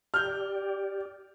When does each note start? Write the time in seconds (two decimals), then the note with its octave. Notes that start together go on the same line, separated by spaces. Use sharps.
0.14 G4 D5 F6 G6